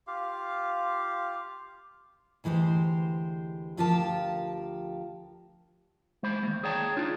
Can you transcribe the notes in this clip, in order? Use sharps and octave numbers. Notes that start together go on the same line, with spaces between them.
F4 G4 F5
D2 E3 G#3 G4 C5
D2 F3 F4 G4 A#4 A5
G#3 C5 B5
D#2 A3
G#4 C#5 D5 G5 A5 A#5
D4 D#4 F4 G#4